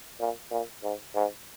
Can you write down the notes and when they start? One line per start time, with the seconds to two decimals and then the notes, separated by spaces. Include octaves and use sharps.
0.20 A#2
0.51 A#2
0.83 G#2
1.15 G#2